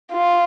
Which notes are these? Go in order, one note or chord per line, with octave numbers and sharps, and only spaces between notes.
F4